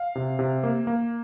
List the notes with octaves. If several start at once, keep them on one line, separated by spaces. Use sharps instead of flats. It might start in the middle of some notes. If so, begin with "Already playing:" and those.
Already playing: F5
C3
C3
A#3
A#3